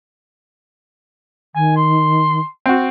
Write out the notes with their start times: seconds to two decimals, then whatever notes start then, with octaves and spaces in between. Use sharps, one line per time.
1.55 D#3 G#5
1.76 C6
2.66 C4 F#4